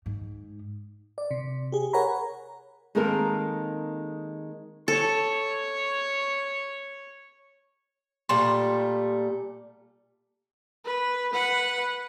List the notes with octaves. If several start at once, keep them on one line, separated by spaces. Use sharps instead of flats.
G#2
D5
C3
G4 G#4
A#4 C#5 F#5 G#5 A#5 B5
D#3 G#3 A#3 C4 A4 A#4
A4 C#5
A#2 G3 A3 C6
B4
B4 F#5